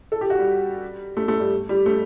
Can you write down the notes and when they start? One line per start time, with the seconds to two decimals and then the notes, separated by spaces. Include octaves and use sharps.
0.12 A4
0.21 G4
0.30 F#4
0.39 G3
1.17 A3
1.28 A3
1.40 G3
1.69 G3
1.86 A3